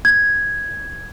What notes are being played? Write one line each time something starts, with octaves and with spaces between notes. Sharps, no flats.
G#6